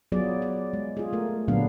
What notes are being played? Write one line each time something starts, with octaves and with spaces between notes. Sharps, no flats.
F#3 B3 F4 G#4 D5
D5
G#3
F4 G#4
A3 A#4
A#2 D3 F#3 B3 D4 F5